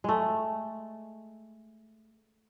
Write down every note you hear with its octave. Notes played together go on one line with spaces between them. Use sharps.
G#3 A3